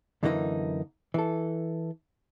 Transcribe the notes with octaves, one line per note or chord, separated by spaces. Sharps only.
F#2 D3 E3 A#3 B3 D#4
E3 A4